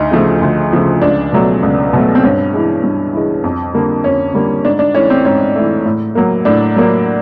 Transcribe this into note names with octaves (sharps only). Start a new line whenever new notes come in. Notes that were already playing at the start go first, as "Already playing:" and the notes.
Already playing: D2 D#4
C#3 F3 A3
D2
C#3 F3 A3
C#2 D4
B2 F#3 A3
C#2
B2 F#3 A3
C4
G2 C#4
E3 G#3
G2
E3 G#3
F2
D3 G3 A#3
F2 C#4
D3 G3 A#3
G#2 D4
D4
E3 A3 C#4
C4
G#2 C#4
E3 A3
A2
F#3 A#3
A2 D4
F#3 A#3